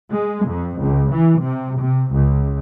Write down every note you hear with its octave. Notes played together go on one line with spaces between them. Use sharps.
G#3
F2
C#2
E3
C3
C3
C#2